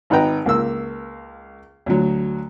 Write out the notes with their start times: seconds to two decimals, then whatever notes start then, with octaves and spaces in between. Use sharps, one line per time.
0.10 G#1 D#4 B4 F#5 G5 A#5
0.46 C#2 A#3 E6
1.86 D2 F#3